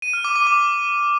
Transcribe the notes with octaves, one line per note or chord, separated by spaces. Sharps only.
D#7
F6
D6
D6
D6